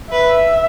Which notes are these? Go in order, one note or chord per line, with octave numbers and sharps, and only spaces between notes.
B4 E5